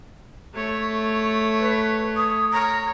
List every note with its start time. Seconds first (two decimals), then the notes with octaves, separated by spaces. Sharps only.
0.54 A3 C#5
1.60 B4
2.16 D#6
2.53 C#5 A#5